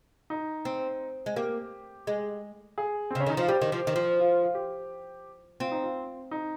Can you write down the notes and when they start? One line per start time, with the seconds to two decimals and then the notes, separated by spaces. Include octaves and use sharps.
0.30 D#4
0.65 C4
1.26 G#3
1.36 A#3 G4
2.07 G#3
2.78 G#4
3.11 C4
3.15 C#3 C#4
3.26 D#3 D#4
3.37 F3 F4
3.48 G3 G4
3.62 D#3
3.72 F3
3.87 D#3
3.96 F3
4.20 F4
4.43 F4
4.54 G4
5.60 C4 F4
5.72 D#4
5.83 F4
6.31 D#4